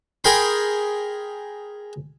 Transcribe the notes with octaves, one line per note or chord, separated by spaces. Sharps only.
G#4 A#4 G5 B5 C6